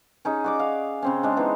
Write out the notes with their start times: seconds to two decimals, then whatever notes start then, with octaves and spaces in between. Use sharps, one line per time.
0.25 C#4 D#4 G#4
0.44 F#4 D5 D6
0.59 F5
1.02 C#3 C4 C#4
1.23 G#3 D4
1.37 E3 B3 D#4